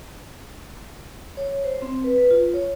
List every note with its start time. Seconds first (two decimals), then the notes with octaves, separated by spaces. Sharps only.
1.37 C#5
1.64 C5
1.82 C4
2.04 B4
2.18 B4
2.31 F4
2.54 C#5